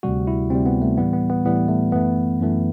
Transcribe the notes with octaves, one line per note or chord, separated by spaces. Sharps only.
D2 C3 G3 F#4
E4
D2 C3 G3 C4
B3
A3
A2 E3 G3 B3
B3
B3
A2 E3 G3 B3
A3
F#2 E3 A3 B3
F#2 E3 A3